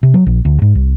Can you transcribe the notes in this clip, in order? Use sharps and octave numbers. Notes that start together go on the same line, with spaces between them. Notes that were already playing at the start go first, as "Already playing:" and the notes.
C3
F#3
A#1
D2
G#2
C2